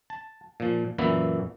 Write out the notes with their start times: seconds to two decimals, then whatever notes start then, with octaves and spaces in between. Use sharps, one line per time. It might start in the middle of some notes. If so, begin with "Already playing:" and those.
0.10 A5
0.60 A#2 F3
0.98 F#2 A#2 E3 A#3 B3 E4